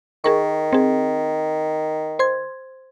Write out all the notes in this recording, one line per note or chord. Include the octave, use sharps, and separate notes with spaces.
D#3 G#4 A#4 C#6
C4 G#4
C5 C6 G#6